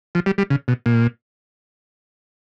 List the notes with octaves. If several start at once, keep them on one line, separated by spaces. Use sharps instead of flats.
F3
G3
G3
C#3
B2
A#2